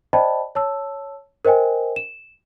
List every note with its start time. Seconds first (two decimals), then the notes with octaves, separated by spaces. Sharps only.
0.13 C5 D5 D#5 G5 A5 B5
0.55 C#5 A5 E6
1.45 A#4 C5 D#5 G5 G#5
1.96 E7